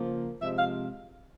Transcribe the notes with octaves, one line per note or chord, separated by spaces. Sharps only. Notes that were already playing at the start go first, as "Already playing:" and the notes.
Already playing: C#3 F3 A#3
C3 F3 G#3 E5
F5